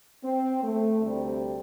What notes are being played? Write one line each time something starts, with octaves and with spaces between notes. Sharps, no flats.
C4
A3
D2 C3 G3 C4